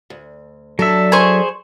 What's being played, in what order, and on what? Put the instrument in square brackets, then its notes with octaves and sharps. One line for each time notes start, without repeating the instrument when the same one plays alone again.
[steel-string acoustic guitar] D2
[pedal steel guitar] F#3 E5 [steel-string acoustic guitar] D4 A4
[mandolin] G#4 C5 C#6